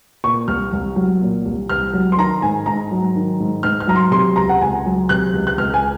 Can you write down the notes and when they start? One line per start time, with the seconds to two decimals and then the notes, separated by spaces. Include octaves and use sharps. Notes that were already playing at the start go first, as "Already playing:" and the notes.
0.24 A#2 C#6
0.48 C2 F6
0.73 C2
0.96 F#3
1.22 A#2
1.45 C2
1.69 C2 F6
1.94 F#3
2.12 C6
2.17 D#3 A#5
2.42 G#2 G#5
2.66 G#2 A#5
2.91 F#3
3.15 D#3
3.40 G#2
3.63 G#2 F6
3.80 F6
3.87 F#3 A#5
3.96 C6
4.12 C3 C6
4.36 C#2 A#5
4.49 F#5
4.61 C#2 G#5
4.86 F#3
5.09 C3 F#6
5.33 C#2
5.47 F#6
5.57 C#2 F6
5.74 G#5